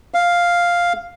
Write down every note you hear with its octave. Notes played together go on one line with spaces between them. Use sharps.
F5